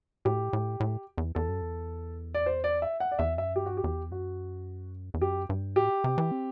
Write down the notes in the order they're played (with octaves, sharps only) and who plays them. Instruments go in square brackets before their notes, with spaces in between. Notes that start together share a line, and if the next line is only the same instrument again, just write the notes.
[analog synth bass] A2 [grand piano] G4
[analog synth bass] A2
A2
E2
[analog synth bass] E2 [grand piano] A4
[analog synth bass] F#2
E2
[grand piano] D5
C5
D5
E5
F#5
D5
[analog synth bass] E2 [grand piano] E5
[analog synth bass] F#2 [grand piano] E5
[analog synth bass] G2 [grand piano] G4
[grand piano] F#4
G4
[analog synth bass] E2
[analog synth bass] F#2 [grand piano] F#4
[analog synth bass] E2
[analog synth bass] F#2 [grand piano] G4
[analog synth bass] G2
[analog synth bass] A2 [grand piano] G4
[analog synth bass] C3
E3
C4